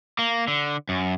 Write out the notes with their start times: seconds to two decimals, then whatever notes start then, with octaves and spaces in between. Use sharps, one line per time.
0.19 A#3
0.48 D3
0.89 F#2